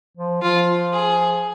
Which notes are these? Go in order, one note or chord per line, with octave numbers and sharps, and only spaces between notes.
F3
F3 F4
G#4